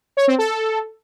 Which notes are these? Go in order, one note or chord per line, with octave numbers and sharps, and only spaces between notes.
C#5
C4
A4